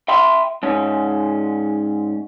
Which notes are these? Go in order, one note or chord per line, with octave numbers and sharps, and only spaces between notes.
E5 G5 B5 C6
G#2 C#4